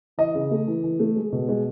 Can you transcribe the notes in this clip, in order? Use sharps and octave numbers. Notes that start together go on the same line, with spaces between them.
E3 D#5
C#3
A3
E3
E3
A3
G#3
B2
G#3